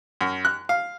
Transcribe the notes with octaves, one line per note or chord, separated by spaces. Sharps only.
F#2
F#6
F5